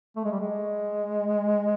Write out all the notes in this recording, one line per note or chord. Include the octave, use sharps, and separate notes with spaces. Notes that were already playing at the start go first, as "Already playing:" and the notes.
A3
G#3
G3
G#3